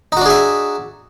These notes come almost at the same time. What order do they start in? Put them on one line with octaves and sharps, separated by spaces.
D#4 F#4 D4 G#4 E5